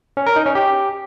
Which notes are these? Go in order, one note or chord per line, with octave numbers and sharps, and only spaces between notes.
C#4
A#4
D#4
C#4
G4